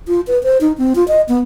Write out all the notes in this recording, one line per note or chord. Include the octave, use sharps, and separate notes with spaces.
F4
B4
C5
D#4
C4
F4
D#5
B3